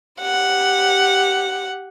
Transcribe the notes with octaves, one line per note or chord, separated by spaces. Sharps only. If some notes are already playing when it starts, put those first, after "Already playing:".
G4 F#5